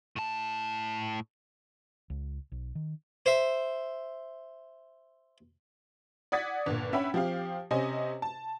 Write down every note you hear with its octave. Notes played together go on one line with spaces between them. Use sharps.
A2 A5
C#2
B1
D#3
C5 E5
D5 F#5 D#6 G#6 A6 B6
G1 A#2
C#4 E5 F#5 G5 B5
F3 C4 G4 F5
C3 C#4 C5 D#5 G#5
A5